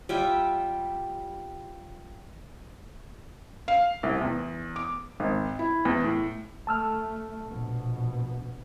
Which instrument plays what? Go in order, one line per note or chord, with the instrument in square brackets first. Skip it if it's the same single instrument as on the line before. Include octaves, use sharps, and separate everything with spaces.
[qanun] G3 F4 E5 G5
[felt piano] F5
C2
E2
D6
G#1
E4
E2
A2
[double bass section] A3 [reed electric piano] A5 E6 F6
[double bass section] A#1 B2